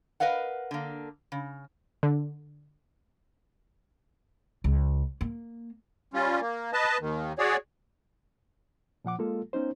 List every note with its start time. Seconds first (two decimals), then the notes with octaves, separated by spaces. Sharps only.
0.20 A#4 B4 D#5 F5 F#5
0.71 D3 A#3
1.32 C#3
2.03 D3
4.64 C#2
5.21 A#3
6.14 G3 C#4 F4
6.40 A#3
6.73 B4 D#5 A5
7.01 D#2 D#3
7.38 F#4 G#4 C#5 D5
9.05 A#2 F3 F#5 D6
9.19 G#3 A#3 F4 A4
9.53 B3 C#4 D#4 C5